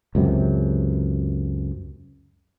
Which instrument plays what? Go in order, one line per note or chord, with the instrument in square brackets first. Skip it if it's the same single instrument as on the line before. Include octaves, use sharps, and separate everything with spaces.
[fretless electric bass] C#2 F#2 C3